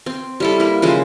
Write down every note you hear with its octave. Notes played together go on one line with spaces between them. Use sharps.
C4
G3 E4 A4
A#3 E4
C#3 F3 G#3